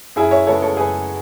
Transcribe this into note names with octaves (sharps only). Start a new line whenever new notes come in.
F#2 E4 G#4
C#5 E5
C#3 G#3 B3 A4 C#5
A4 C#5
F#2 G#4 B4